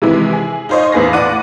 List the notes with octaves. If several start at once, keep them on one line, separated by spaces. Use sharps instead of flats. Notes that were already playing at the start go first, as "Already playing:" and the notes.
C3 D#3 E3 G#3 E4
G#4
D#4 F4 C5 C#5 D#5
E2 A2 B3 G#4 F5 A#6
A2 D5 F#5 D6 F#6 D#7